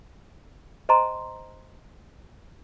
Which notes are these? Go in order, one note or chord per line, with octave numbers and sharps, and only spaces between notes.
C5 D#5 G#5 A#5 C6